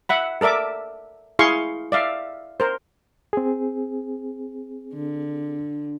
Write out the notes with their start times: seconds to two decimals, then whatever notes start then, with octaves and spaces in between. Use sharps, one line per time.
0.09 E5 F#5 B5
0.41 A4 A#4 D5 E5 D6
1.39 E4 G#4 F5 C6 C#6
1.92 D5 E5 F5
2.60 A#4 C5
3.33 C4 G#4
4.94 D3